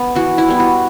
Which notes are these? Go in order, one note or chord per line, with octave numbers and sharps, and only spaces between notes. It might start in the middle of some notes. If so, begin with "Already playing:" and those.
Already playing: B3
E3 F#4
E4
G3 B3
F#4